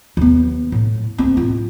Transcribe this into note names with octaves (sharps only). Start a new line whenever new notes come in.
D#2 B3
A2
D2 C4
A2 F4